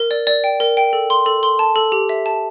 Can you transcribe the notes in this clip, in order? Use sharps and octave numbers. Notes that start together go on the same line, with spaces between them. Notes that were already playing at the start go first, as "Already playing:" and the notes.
Already playing: A#4
D5
D5
G5
A#4
G5
A4
C6
A4
C6
A5
A4
G4
E5
A5